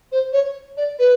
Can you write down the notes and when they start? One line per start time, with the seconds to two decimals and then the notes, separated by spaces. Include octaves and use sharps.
0.12 C5
0.33 C#5
0.77 D5
0.99 B4